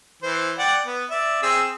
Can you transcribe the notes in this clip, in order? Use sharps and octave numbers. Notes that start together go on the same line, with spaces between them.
E3 C5
D5 F#5 G5
B3
D5 E5
C4 G#4 E6